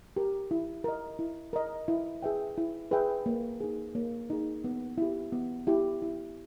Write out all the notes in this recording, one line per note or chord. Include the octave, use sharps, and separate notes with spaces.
G4 A#4
E4
A#4 D#5
E4
A#4 D#5
E4
G#4 B4 E5 G5
E4
G#4 B4 E5 G5
A#3
D#4 G#4
A#3
D#4 G#4
B3
E4 G4
B3
E4 G4
E4